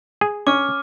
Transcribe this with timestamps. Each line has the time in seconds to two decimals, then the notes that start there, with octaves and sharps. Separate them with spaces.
0.21 G#4
0.47 C#4 D6 F6